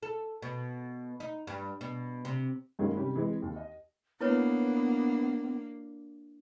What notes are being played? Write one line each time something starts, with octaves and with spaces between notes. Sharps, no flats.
A4
B2
D#4
G2
B2
C3
G2 D#3 F#3 G#3 A#3 C#4
C3 D#3 G3 C#4 G4
E3 G#3 C4
D#2
D#5
A#3 B3 D4 E4 B4 C#5